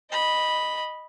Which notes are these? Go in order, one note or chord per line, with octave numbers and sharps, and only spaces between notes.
D#5 B5